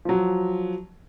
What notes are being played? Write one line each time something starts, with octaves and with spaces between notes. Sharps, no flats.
F3 F#3